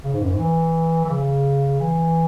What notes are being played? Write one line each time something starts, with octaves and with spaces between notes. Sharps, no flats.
C#3
G#2
F#2
G#2
E3
E3
C#3
E3